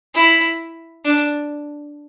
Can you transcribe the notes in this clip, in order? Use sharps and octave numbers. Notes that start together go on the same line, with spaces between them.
E4
D4